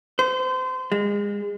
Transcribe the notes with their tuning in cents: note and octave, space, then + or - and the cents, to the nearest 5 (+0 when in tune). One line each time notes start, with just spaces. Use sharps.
C5 -30
G#3 -30